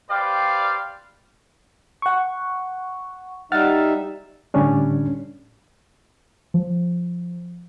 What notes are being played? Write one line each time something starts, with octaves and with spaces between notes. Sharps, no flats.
G4 B4 C5 D5 F5
F#5 C#6
G3 D#4 E5 F#5 F6 A6
A2 D3 G3 C#4 D4
F3